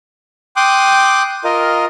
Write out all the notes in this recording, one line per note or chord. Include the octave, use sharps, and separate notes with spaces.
G5 C6 D6 D#6 F#6
F4 A#4 D#5